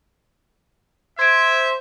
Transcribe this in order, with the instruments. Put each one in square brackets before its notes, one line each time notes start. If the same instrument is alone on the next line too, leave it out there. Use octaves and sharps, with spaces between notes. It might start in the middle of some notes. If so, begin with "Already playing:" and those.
[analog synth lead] C5 [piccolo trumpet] E5 [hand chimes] G#6 D7